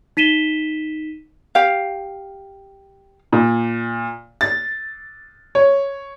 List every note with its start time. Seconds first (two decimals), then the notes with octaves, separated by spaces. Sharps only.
0.17 D#4 B6 D#7 E7 G7
1.55 G4 F5
3.32 A#2
4.41 A6
5.55 C#5